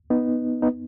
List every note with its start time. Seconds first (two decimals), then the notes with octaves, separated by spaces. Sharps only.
0.10 B3 D#4
0.62 B3 D#4